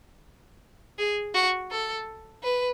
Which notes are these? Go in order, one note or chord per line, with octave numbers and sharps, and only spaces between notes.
G#4
F#4
A4
B4